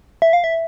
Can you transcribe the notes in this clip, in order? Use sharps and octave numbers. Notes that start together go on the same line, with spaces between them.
E5
F5
E5